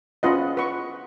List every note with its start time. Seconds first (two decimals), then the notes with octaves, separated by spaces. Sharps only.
0.23 C#4 F4 B4 D#5 F#5
0.57 B4 F#5 C#6